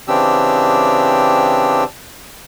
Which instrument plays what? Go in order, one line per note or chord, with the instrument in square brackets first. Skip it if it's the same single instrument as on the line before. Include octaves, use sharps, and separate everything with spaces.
[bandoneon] C#3 E3 C4 D4 G4 E6